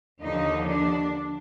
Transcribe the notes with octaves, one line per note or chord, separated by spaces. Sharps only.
D#2 D3 F3 D#4
D4